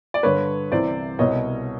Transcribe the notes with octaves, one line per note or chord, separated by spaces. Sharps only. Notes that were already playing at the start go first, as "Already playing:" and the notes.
D5
G2 D3 B4 C#5
C2 C3 E3 C5 D5
C2 B2 C#5 D#5